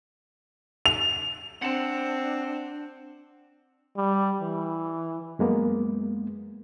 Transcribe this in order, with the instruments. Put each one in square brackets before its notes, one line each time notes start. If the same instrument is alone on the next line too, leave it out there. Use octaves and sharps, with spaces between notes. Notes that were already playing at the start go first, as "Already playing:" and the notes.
[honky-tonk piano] F7
[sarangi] C4 [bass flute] D4 [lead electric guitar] F#5 A5
[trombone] G3
E3
[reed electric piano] F#2 G#3 A#3 B3